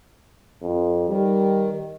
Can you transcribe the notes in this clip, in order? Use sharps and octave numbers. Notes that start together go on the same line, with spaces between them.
F2
D#3 G3